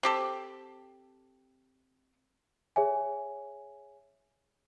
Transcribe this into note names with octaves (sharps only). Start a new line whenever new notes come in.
C4 G4 A4
G#4 C#5 E5 G#5